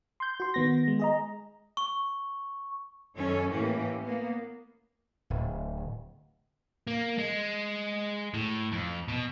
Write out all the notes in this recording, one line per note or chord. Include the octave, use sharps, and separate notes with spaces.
C6 G6
F#4 C6
D#3 B3 A#6
G#3
G#4 D#5 A#5
C#6
F#2 D#3 C#4 A4 C#5
A2 E3 A#3 C#4 G4
A#3 B3
D1
A#3
G#3
A2
F2
B2